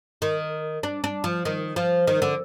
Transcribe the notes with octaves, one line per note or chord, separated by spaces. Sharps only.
D#3
D4
D4
F3
D#3
F3
D#3
D3